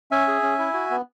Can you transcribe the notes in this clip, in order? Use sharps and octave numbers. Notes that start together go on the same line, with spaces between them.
C#4 E5 G#5
G#4
C#4
E4
F#4
B3